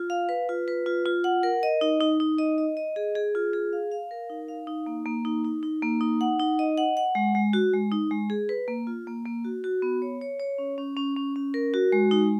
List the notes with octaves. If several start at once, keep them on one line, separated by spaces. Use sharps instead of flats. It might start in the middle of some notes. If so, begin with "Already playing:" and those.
Already playing: F4
F5
B4
F4
B4
F4
F4
F#5
A#4
D#5
D#4
D#4
D#4
D#5
D#5
D#5
G#4
G#4
F4
G#4
F5
F5
A#4
D#4
F5
D#4
A#3
A#3
D#4
D#4
D#4
A#3
D#4
F#5
D#4
D#5
F#5
F#5
G#3
G#3
F#4
G#3
D#4
G#3
G#4
B4
A#3
F4
A#3
A#3
F#4
F#4
B3
C#5
C#5
C#5
C#4
C#4
C#4
C#4
C#4
A#4
F#4
G#3
D#4